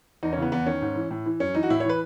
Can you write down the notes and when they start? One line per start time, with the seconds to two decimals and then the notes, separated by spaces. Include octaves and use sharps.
0.23 E2 D#4
0.33 C#4
0.37 C#3 E3 B3
0.52 E2 B3
0.66 D#3 C#4
0.82 G#2
0.96 E3
1.11 A2
1.26 E3
1.40 F#2 C#4
1.55 E3 D#4
1.63 F#4
1.70 A2 E4
1.80 C#5
1.85 E3 B4